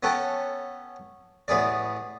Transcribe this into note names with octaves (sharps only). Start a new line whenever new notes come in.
B3 C#4 A4 F#5 G5
A1 B3 G#4 D5